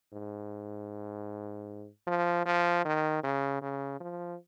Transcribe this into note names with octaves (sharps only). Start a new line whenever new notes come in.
G#2
F3
F3
D#3
C#3
C#3
F3